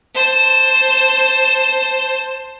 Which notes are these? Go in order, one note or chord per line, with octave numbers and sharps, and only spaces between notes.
C5 A5